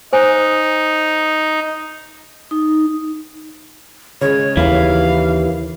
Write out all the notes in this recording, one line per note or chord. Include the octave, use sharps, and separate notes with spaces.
D#4 C5 G#5
D#4
C#3 G#3 C#5
D#2 E3 F5